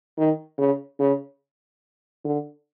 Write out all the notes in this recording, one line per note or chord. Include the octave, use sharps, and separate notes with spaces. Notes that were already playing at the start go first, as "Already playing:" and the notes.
D#3
C#3
C#3
D3